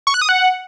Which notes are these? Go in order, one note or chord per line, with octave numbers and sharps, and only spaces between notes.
C#6
F#6
D#6
F#5